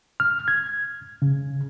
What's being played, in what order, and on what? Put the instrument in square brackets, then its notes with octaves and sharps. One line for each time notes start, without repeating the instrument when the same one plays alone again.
[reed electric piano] F6
G#6
C#3